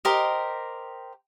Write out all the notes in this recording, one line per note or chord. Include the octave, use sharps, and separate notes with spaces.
G4 A#4 C5 D#5